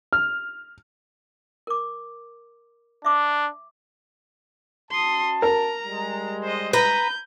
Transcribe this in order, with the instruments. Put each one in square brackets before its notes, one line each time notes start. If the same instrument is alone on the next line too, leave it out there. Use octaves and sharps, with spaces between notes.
[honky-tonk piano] F6
[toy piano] A#4 D6
[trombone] D4 [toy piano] E5 D6
[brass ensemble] C#4 F#4 A5 [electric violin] C6 D#6
[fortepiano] A#4 [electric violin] A#5
[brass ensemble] G3 G#3
[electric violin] C5 D#5
[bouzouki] B4 A#5 [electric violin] G6